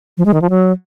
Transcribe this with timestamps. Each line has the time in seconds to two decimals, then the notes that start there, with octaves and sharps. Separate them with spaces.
0.18 F3
0.26 G#3
0.34 D#3
0.42 F3
0.50 F#3